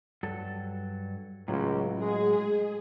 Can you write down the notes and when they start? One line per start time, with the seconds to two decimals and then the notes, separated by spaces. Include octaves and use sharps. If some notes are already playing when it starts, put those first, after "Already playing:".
0.23 G2 F#3 A4
1.48 C#2 A2 F#3
2.02 G#3 G#4